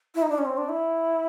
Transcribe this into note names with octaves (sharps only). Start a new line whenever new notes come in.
E4
D#4
D4
C#4
C4
D4
E4